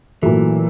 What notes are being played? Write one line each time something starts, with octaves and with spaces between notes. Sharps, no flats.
A#2 E3 F#3 A3